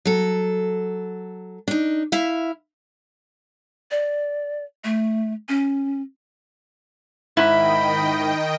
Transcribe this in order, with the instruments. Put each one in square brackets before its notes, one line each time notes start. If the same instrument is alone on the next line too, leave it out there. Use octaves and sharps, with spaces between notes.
[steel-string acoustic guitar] F#3 A4
D4 D#4
E4 E5 F5
[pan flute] D5
A3
C#4
[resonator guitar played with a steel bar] G#2 E4 [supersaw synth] D#3 D#5 G5 [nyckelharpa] B5